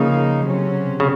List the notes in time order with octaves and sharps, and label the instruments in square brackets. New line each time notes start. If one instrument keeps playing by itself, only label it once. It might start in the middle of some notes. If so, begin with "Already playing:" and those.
Already playing: [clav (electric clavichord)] C#3 [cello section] F3 A#3 D#4
[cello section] C3 F#3 C#4
[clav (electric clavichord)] C#3